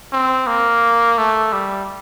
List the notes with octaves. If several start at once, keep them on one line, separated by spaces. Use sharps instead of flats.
C4
A#3
A3
G3